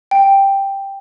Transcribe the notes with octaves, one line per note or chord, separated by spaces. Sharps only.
G5